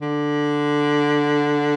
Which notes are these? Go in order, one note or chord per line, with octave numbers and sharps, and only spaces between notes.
D3